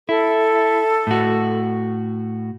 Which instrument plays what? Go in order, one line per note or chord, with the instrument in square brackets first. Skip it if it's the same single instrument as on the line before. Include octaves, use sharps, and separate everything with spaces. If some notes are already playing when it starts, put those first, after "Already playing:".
[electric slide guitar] E4 [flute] A4
[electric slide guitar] A2 F#4